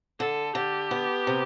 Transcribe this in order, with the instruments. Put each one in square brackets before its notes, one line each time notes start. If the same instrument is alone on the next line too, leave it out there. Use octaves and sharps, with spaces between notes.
[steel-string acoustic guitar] D3 [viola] A4
[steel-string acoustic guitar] D3 [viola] G4
[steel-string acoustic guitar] B3
C3